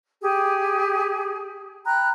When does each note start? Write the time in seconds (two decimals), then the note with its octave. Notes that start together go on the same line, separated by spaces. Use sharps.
0.21 G4 G#4
1.85 G5 A#5 B5 F#6